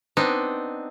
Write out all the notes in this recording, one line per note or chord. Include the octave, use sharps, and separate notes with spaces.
B3 C4 D4 D#4